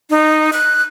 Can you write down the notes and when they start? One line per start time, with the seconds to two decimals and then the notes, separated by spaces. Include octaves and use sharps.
0.10 D#4
0.53 F#6